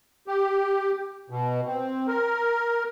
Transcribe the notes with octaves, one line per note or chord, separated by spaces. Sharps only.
G4
B2
C4
A#4